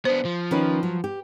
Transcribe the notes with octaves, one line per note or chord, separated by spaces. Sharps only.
B3 D4 C5
F3
D#3 C#4 B4
F#3
G4